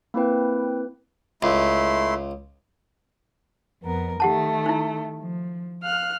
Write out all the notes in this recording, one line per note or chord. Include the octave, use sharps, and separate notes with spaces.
A#3 C4 E4 B4 G5
C#2 A3 E4 C6
F2 B3 A#4
D#3 A3 G4 F#5 A5
D#4 E4
F3
F5 F6 F#6